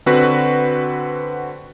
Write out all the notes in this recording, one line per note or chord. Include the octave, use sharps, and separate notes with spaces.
D3 C4 F#4 B4